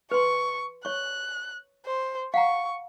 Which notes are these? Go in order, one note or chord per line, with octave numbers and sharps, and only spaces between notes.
B4 C6 C#6
C#5 C#6 F#6
C5
F5 F#5 A#5 C#6